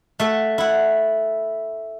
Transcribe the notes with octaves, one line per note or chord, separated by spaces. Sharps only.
A3 E5 F#5
E4 F#5